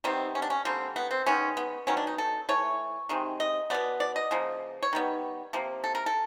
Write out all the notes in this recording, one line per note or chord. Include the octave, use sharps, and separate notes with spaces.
C3 D#3 G3 B3 C4
C#4
D4
C#4
D3 G3 A#3 C4
B3
C4
D#3 G#3 B3 C#4
B3
D#3 F#3 B3 C#4
D4
D#4
A4
E3 A3 C#5
C3 D#3 G#3
D#5
B2 G#3 B3 D5
D5
D#5
C#3 F3 A#3
C#5
D#3 G3 B3
C3 F3 A#3
A4
A#4
A4